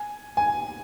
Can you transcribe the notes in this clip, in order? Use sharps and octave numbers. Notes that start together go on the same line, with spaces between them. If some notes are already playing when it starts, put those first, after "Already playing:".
Already playing: G#5
G#5